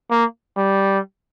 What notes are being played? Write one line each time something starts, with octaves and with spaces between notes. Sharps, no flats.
A#3
G3